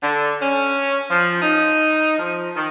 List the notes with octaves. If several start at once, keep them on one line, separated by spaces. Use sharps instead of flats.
D3
C#4
F3
D#4
F3
D#3